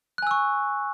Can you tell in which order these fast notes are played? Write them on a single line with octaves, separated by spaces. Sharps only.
F#6 G#5 E6 C#6